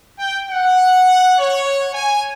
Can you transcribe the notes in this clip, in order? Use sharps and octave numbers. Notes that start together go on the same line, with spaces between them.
G5
F#5
C#5
G#5